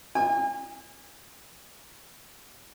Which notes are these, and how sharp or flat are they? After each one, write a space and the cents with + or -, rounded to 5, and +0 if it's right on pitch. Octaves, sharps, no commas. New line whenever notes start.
G#5 -40